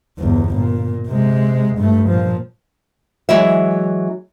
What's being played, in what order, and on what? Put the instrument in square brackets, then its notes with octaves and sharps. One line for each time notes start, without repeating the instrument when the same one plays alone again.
[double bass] G1 E2
A#2
C3 G#3
G2 A3
A#2 F3
[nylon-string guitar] E3 F#3 G#3 E4 E5